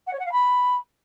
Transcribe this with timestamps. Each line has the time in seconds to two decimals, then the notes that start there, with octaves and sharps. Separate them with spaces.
0.06 F#5
0.13 C#5
0.19 F#5
0.25 F5
0.32 B5